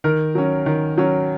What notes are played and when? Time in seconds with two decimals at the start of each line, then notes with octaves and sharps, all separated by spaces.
0.04 D#3 A#4
0.35 F#3 C#4
0.66 D#3
0.98 F#3 C#4